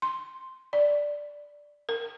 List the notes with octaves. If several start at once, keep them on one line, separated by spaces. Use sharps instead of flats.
C6
D5
A#4